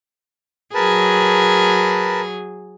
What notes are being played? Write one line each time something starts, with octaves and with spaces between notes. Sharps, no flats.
F#3 G#4 A#4 B4 A5